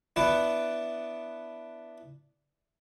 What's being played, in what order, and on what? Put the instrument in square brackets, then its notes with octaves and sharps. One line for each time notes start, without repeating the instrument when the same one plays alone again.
[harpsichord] B3 D4 E4 B4 D5 F#5